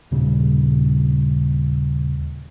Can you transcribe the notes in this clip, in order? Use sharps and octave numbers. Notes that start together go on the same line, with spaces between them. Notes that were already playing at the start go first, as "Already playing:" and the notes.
D#2 A#2 C#3 G3